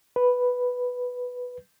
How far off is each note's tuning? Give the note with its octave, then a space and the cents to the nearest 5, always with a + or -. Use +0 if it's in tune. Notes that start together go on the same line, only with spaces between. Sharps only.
B4 +0